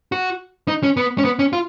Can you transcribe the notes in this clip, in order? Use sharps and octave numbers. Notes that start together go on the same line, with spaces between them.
F#4
D#4
C#4
B3
C#4
B3
C#4
F4